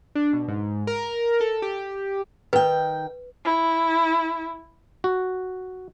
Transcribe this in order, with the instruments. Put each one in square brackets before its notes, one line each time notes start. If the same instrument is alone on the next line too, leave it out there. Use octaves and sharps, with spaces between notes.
[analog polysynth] D4
B2
G#2
A#4
A4
G4
[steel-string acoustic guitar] D#3 G5 [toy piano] B4
[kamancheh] E4
[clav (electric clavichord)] F#4